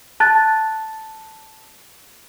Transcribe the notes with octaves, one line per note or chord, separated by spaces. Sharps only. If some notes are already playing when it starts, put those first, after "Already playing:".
A5 F#6 A6